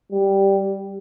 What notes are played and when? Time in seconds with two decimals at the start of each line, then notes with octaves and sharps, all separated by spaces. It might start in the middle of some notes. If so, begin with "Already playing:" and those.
0.12 G3